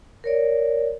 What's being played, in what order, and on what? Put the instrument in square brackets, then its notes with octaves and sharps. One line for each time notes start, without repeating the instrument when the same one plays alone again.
[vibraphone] A#4 C#5 D5